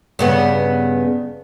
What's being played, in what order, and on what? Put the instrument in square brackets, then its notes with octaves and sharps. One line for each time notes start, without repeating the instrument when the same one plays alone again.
[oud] G2 C#3 B3